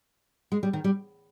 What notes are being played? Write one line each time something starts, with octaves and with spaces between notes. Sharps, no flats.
G#3
G3
D#3
G3